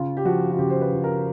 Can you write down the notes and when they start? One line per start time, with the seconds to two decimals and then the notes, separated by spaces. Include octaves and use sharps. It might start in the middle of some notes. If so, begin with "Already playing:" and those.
Already playing: C#3 F4
0.17 G4
0.25 F3 F#4
0.53 F#4
0.59 C#3 G4
0.70 C5
0.81 B4
0.93 F3
1.04 A#4